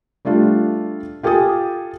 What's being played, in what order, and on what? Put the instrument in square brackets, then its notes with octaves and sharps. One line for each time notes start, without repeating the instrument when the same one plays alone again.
[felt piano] G3 A3 D4 F4
F4 G4 A4 G#5 D#6